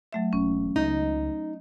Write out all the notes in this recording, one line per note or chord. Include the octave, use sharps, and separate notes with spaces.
F#3 A3 E5
E1 C#4
C#2 D#4 D#5